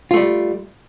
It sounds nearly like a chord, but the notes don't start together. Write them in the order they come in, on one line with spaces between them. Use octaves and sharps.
F4 A3 G3